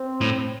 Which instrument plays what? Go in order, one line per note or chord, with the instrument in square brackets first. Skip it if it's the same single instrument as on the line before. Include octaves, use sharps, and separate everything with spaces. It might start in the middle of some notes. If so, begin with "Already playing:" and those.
Already playing: [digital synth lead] C4
[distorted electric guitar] A2